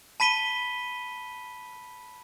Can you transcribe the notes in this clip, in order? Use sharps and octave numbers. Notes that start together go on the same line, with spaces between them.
A5 B5 B6 D#7 G7